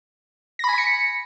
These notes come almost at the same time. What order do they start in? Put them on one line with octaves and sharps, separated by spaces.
A#6 B5 G#5 B6 C#7